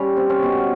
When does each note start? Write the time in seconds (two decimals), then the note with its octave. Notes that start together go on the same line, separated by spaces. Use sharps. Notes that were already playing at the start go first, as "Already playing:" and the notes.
Already playing: G3 C#4
0.17 C4
0.30 C#4
0.43 B2